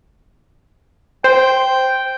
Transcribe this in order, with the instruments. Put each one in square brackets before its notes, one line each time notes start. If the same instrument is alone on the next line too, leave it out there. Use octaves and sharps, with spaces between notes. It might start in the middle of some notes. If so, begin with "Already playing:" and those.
[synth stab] C5 [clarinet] G5